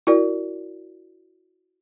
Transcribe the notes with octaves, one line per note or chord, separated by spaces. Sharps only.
E4 F#4 A#4 D5